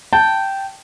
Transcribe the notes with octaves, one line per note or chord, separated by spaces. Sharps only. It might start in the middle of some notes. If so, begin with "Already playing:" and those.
G5 A5